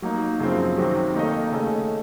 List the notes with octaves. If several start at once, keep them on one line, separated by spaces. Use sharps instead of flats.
F#3 A#3 D#4
F#2 C#3 F3 C4
C3 D#3 F#3 C4
D#3 A#3 D#4 A4 D#5
C#3 A3 C#4 A4 D#5